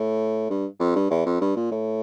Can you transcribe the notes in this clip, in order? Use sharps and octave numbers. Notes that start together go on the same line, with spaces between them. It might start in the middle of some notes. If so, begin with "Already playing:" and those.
Already playing: A2
G2
F2
G2
E2
F2
G2
A#2
A2